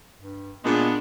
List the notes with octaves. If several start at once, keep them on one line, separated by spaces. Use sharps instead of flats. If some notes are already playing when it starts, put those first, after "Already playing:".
G2
A#2 G#3 B3 D4